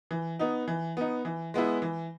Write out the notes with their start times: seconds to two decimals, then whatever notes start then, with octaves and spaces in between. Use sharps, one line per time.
0.11 E3
0.39 B3 D#4
0.68 E3
0.97 B3 D#4
1.25 E3
1.54 G#3 B3 E4
1.82 E3